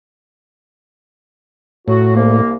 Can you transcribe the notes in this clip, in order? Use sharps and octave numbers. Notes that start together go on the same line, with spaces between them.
A2 F#3 F#4
C2 A#3